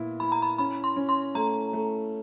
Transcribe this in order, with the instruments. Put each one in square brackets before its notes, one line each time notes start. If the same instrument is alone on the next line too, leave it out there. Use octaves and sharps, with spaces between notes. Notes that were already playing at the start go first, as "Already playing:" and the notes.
Already playing: [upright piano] A#2 B3 E4
[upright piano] E4 [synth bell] B5
[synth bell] A#5
B5
[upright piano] C#4 [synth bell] B5
[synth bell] C6
[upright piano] C#4
[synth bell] C6
[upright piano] A3 [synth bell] A#5
[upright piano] A3